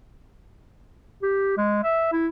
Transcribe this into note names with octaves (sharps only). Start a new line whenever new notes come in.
G4
G#3
E5
E4